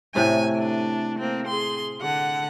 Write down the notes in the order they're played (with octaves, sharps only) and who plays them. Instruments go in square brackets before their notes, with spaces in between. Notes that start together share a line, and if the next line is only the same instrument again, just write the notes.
[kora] A2 C3 A3 [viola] G#5
[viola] D4
A#3 C4
G#4 C6
D3 F#5